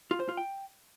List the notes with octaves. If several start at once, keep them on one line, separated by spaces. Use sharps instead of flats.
F4
C5
F4
G5